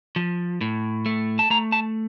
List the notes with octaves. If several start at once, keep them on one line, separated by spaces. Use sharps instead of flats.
F3
A2
A3
A5
A3 A#5
A5